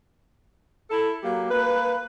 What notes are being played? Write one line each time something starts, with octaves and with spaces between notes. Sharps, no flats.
E4 A4
F#3 A#3 G4
A#3 B4